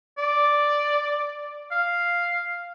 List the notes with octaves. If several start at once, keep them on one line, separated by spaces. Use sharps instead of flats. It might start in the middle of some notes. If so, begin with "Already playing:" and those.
D5
F5